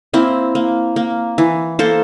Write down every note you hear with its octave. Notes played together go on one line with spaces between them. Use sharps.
A#3 C4 E4
A#3
A#3
E3
A#3 A4 C5